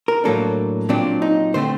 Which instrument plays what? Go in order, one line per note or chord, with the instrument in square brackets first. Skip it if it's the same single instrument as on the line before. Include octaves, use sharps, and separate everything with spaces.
[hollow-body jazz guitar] A#4
A2 F#3 A#3 D4 A4
A#2 F#3 C4 D4
D#4
D3 A3 C4 C5